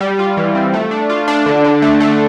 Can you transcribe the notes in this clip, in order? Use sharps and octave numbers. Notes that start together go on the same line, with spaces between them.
G3
F4
E3
C4
A3
D4
F4
D4
D3
D3
A3
A3